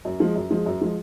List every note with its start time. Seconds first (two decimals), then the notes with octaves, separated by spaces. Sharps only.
0.05 F#2
0.20 F3 G#3
0.36 F#2
0.51 F3 G#3
0.66 F#2
0.81 F3 G#3